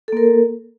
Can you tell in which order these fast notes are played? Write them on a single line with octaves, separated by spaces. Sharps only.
A4 A#3 A#4